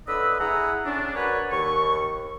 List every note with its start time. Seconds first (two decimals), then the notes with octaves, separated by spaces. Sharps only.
0.07 A2 D3 B4 D#5 E6
0.40 E4 G#4 F#5 A#5 E6
0.85 C#4 D4
1.15 F#4 A#4 B4 C#5 D5
1.51 D#2 C#6